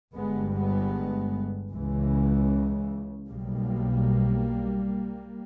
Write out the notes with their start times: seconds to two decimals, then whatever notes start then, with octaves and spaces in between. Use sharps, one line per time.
0.13 G1 G2 G#3 B3
0.53 G#3 B3
1.71 C#2 C#3 E3 G#3
3.30 B1 B2 G3 A#3